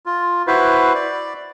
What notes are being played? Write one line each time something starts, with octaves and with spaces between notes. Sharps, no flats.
F4
E4 F#4 B4 C5
D5